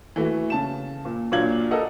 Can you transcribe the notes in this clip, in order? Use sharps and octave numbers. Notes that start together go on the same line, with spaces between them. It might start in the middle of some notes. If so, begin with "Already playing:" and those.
E3 A3 E4 F#4
C#3 A5 E7
A#2
A#2 F#3 D4 F4 G#6 F#7
A4 A#4 D#5 F#5